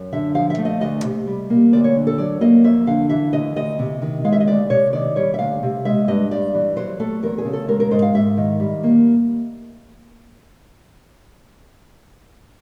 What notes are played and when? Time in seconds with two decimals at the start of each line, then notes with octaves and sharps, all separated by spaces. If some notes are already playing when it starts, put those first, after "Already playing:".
Already playing: F#2
0.12 D3 E5
0.34 F3 F5
0.50 E5
0.58 A3
0.65 D#5
0.81 D2 D#5
1.04 C3
1.27 G3
1.50 A#3
1.73 D2 D5
1.84 C#5
1.96 D3
2.07 A4
2.18 F#3 D5
2.41 A#3 D#5
2.64 F2 E5
2.87 D3 F5
3.09 E3 E5
3.33 D2 D#5
3.56 D2 D#5
3.79 C3
4.02 D#3
4.24 G#3 F5
4.32 E5
4.40 D#5
4.47 D2 D5
4.70 C3 C#5
4.93 D#3 D5
5.16 G3 C#5
5.34 E5
5.39 D2 F5
5.63 C3
5.85 G#3 E5
6.08 G2 D#5
6.31 G2 D5
6.54 E3
6.76 F#3 C5
7.00 A3 A4
7.23 E2 A#4
7.38 G#4
7.45 C#3
7.53 A4
7.68 G#3 A#4
7.80 A#4
7.91 G#2 C5
8.02 F5
8.14 G#2 E5
8.37 D#3
8.60 G3
8.84 A#3